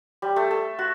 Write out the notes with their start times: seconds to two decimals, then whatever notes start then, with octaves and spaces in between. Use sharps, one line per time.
0.22 G3
0.36 A3
0.51 A4
0.79 F#4